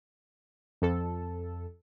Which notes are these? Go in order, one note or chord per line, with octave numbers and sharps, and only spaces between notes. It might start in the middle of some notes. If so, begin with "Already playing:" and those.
F2 A4